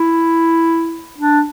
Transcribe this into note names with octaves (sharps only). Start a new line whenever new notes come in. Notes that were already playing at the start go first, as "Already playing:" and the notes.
Already playing: E4
D4